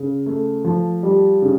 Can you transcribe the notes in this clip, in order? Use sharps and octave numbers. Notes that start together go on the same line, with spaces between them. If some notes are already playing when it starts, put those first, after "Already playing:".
Already playing: C#3
A3
F3
G3
C#3